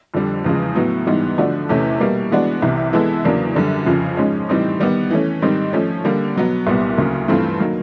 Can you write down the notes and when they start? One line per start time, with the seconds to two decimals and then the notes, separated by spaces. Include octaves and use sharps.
0.14 F2 D3 G3
0.44 E2 C#3 F3 G#3
0.75 A2 F#3 B3
1.07 G#2 E3 G3 B3
1.38 D3 F3 A3 D4 F#4
1.69 E2 C3 E3 A3 C#4
2.00 B2 G3 A#3
2.31 E3 G#3 B3 D4 F#4
2.62 C2 C3 E3
2.93 E3 G#3 B3 E4 A4
3.25 E2 C#3 F#3 A#3 D4
3.56 F#2 D3 G3
3.86 F2 C#3 F3
4.17 G#2 F3 G#3 C#4
4.49 A2 E3 G3 C4 D#4
4.80 D#3 G3 B3
5.10 E3 A3 C#4
5.42 G#2 D#3 G3 C4 D#4
5.73 F3 A3 C#4
6.05 D3 G3 A#3
6.36 B2 F#3 B3
6.67 C2 A#2 G3 B3
6.97 D2 C#3 F#3 A#3
7.28 G2 E3 A3 C4 F4
7.59 D#3 F#3 A#3